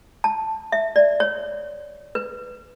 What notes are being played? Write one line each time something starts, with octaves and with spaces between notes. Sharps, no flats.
A5
E5
D5
C#5
B4